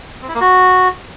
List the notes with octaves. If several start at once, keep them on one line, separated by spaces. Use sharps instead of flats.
C4
E4
A#3
F#4